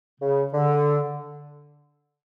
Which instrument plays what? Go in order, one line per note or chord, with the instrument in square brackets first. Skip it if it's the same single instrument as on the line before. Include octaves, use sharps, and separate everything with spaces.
[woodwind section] C#3
D3